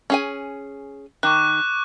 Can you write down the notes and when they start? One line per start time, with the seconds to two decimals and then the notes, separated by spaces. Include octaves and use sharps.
0.10 C#4 G#4 G#5
1.23 D#3 C#6 D6 F#6